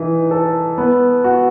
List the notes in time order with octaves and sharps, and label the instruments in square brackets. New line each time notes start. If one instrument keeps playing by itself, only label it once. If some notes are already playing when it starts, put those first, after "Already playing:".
Already playing: [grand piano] E3 D#4
A4
B3
F#4